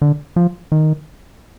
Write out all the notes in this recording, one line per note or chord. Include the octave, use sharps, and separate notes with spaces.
D3
F3
D#3